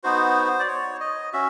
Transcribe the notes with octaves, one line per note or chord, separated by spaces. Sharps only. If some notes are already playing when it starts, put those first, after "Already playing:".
B3 D#4 F#4 C5
D5
C#5
D#5
C#4 F#4 E5